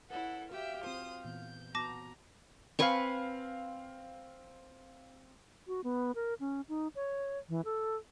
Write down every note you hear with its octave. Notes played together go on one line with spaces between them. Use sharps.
E4 A4 B4 C#5 F#5
F#4 G4 E5 F5 G5
C4 F4 C5 D#6
A#2 E3 B3 G6
B3 F#4 A5 A#5 D6 A#6
C4 B4 F5 G#5 C#6
F#4
B3
A#4
C#4
D#4
C#5
E3
A4